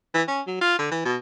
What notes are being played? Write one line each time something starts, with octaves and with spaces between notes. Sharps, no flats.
E3
C#4
F#3
F4
D3
E3
B2